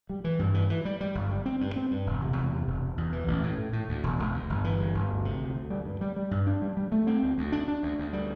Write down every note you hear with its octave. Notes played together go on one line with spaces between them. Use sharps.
G3
E3
G2
E3
E3
G3
G3
G1
G3
C4
G2
C4
G2
E1
C3
E2
C3
E1
E1
E2
E3
A1
A2
A2
A2
D2
E1
E1
D2
G1
E3
G2
G1
D2
C3
D2
D2
G3
G2
G3
G3
G2
D4
G3
G3
A3
C4
D2
D2
D4
D4
D2
D2
G3